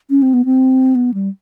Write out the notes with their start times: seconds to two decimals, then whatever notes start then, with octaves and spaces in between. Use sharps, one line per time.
0.10 C#4
0.22 C4
0.34 B3
0.45 C4
0.95 B3
1.14 G3